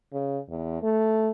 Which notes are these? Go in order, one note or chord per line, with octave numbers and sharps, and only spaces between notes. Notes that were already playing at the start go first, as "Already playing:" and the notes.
C#3
E2
A3